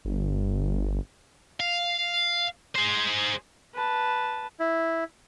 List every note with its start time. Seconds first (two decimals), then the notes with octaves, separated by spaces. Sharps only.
0.05 G1
1.60 F5
2.76 G#4 C5
3.74 B4 A5
4.60 E4